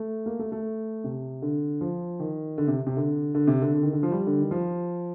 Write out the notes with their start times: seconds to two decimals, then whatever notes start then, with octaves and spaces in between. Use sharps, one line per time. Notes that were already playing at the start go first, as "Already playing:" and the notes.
Already playing: A3
0.26 A#3
0.39 A3
0.52 A3
1.04 C3
1.42 D3
1.81 F3
2.19 D#3
2.58 D3
2.67 C3
2.87 C3
2.97 D3
3.35 D3
3.47 C3
3.62 D3
3.74 D3
3.83 D#3
3.93 D3
4.03 F3
4.12 G3
4.27 D3
4.40 D#3
4.51 F3